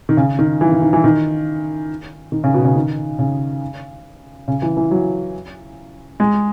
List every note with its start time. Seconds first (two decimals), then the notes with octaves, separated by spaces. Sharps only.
0.09 D#3
0.17 C#3
0.39 D#3
0.61 E3
0.72 D#3
0.82 D#3
0.93 E3
1.04 D#3
2.32 D#3
2.44 C#3
2.54 B2
2.65 C#3
2.76 D#3
3.19 C#3
4.48 C#3
4.62 E3
4.77 E3
4.91 F#3
6.20 G#3